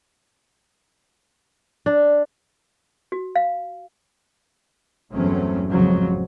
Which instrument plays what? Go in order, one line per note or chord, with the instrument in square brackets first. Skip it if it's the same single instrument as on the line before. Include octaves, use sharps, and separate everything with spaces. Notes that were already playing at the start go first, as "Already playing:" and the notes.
[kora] D4
[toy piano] F#4
F5
[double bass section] G1 E2 F#3 A3 C4 C#4
A1 F2 G#2 C#3 F3 F#3